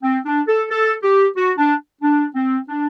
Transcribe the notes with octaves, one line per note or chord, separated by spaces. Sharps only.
C4
D4
A4
A4
G4
F#4
D4
D4
C4
D4